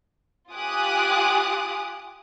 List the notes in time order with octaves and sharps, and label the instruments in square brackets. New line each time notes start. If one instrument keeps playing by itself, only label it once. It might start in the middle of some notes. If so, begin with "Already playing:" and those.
[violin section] F4 G4 G#5 D6 D#6 F#6